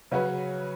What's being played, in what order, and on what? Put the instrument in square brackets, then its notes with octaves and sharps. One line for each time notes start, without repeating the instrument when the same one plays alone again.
[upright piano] C#3 F#3 C#4 F#4 B4